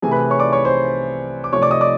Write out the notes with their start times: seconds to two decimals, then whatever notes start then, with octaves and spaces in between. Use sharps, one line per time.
0.02 C3 E3 A3 G#4 G#5
0.11 B4 B5
0.30 C#5 C#6
0.40 D5 D6
0.53 C#5 C#6
0.65 C5 C6
1.44 D6
1.53 C3 F3 A3 C#5 C#6
1.62 D5 D6
1.71 D#5 D#6
1.81 D5 D6